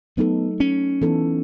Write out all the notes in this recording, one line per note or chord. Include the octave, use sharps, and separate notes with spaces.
F#3 A3 B3 D#4 A4
C#4
E3 B3 D#4 A4